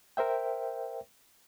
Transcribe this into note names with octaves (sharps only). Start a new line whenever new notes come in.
A#4 C5 E5 G5